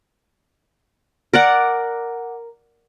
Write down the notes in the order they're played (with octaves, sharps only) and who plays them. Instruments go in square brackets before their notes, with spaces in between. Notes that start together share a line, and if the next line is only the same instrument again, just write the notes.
[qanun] A#4 D5 F#5